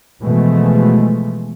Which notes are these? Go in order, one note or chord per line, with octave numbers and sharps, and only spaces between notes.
B2 E3 F3 G#3 A3